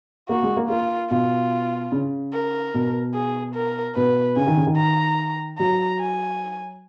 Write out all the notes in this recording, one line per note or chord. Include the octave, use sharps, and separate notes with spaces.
A#3 F#4
G#3
A#3
A#3 F4
B2 F4
C#3
A#4
B2
G#4
A#4
B2 B4
C#3 G#5
D#3
C#3
D#3
A#5
F#3 A#5
G#5